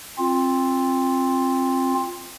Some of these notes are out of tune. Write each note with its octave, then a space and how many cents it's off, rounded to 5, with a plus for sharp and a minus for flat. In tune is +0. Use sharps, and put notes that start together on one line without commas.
C4 +20 F4 +0